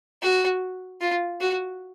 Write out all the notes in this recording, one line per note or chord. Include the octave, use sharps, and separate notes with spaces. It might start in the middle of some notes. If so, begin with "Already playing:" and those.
F#4
F4
F#4